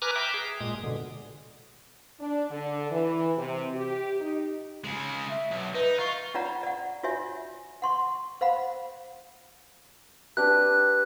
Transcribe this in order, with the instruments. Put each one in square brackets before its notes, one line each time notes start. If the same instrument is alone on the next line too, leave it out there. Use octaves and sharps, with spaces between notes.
[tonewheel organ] B4 G#5 A#5 D6 F6 F#6
E5 G5 A#5 D6
G#4
A#2 G#3 D#6
B2 D3
[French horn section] D4
D3
E3
C3
G4
D#4
[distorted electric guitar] C#3 G#3
[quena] E5
[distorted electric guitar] B1
[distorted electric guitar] D#4 [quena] B4
[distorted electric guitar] F4 [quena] C#6
[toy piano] C#4 F4 C#5 D5 F#5 A#5
D5 F#5
F4 F#4 C#5 E5 G#5
F#5 C6 C#6
C5 F5 F#5 B5
[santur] D4 G4 B4 [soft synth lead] F#6